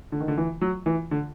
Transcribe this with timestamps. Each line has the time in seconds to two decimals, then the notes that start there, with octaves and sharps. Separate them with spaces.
0.12 D3
0.20 D#3
0.28 D3
0.37 E3
0.61 F#3
0.86 E3
1.11 D3